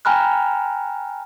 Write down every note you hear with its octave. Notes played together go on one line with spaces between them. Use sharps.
G5 G#5 A#5 B5 F6 F#6